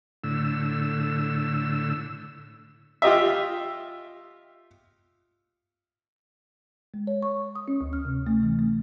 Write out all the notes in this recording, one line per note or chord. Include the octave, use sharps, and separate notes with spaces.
A2 D3 E6
F4 G4 D#5 E5
G#3
C#5
C#6
D#6
C#4
D2
F6
C3
A3
E3
A3